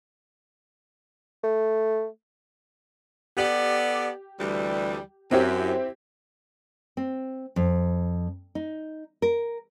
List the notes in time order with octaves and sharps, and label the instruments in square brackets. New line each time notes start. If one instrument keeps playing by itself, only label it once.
[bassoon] A3
[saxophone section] B3 A4 D5 [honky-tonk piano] G4 F#7
[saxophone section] D2 E3 G3
[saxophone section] F#2 [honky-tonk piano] C4 E4 G4
[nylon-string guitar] C4
F2
D#4
A#4